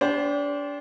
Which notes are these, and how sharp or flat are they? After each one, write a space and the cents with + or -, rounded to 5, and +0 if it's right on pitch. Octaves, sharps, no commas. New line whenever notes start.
D4 -30 G4 +15 C5 +0